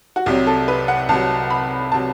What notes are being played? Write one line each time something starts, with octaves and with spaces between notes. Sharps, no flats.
F#4
C2 C3 F#3 G4
A4
B4
F#5
C2 C3 F#3 A5
B5
C3 F#3 A5